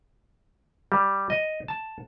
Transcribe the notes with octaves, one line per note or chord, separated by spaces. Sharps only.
G3
D#5
A5